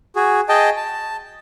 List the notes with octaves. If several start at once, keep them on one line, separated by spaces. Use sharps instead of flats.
F#4 G#4
G#4 D#5 G5 A5
A5